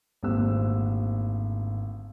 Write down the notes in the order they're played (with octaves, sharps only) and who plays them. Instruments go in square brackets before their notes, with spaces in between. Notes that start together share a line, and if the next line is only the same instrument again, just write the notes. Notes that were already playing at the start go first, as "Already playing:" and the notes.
[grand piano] G#1 D2 A#2 G4 C5 E6